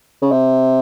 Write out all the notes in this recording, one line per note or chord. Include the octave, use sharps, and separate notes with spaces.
C#3
C3